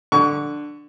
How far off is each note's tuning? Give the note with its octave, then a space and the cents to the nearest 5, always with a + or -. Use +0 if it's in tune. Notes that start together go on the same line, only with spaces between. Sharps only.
D3 +10 C#6 +25